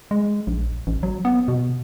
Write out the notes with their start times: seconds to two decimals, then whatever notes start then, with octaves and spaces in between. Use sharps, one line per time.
0.11 G#3
0.47 A#1
0.87 A1
1.03 F#3
1.25 B3
1.48 B2